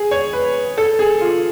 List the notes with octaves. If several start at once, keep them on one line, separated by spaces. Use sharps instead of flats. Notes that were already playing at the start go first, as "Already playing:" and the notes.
Already playing: G#4
C#5
B4
A4
G#4
F4